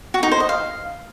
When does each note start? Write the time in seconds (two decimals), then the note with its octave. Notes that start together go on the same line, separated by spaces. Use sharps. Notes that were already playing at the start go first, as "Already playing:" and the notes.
0.14 F#4
0.23 D#4
0.31 C5
0.40 D#5
0.49 F5